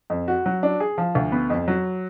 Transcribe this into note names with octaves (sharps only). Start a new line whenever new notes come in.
F2
F#4
F#3
D4
G#4
F3
D2
B3
F2
F#3